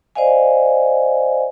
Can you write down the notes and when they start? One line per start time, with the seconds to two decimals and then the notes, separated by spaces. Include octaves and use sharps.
0.15 C5 D5 D#5 F5 G#5